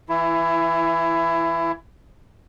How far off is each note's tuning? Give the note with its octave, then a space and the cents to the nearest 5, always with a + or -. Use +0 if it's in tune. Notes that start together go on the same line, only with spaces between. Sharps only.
E3 +0 E4 +20